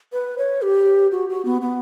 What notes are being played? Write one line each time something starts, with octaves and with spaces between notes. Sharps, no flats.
B4
C#5
G4
F#4
F#4
B3
B3